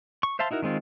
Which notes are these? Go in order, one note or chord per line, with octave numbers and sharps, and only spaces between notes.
C#6
C5 E5 F5 A5 C6
D#4 E4 F#4 A#4
D#3 G#3 C4 F4